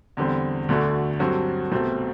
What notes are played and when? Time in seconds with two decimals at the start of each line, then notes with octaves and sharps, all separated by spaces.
0.17 E2 D3 G3 C4
0.69 D2 D3 A3 D4 F#4
1.20 G2 F#3 C4 F#4 A4
1.72 C2 B2 A3 C4